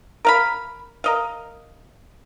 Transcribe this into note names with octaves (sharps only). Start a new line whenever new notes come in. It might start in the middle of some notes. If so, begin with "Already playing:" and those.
A#4 F5 B5
A#4 D#5 F5